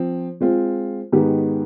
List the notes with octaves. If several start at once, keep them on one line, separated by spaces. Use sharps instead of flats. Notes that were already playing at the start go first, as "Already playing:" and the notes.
Already playing: F3 C4
G#3 C4 F4
G#2 D#3 B3 D#4 G4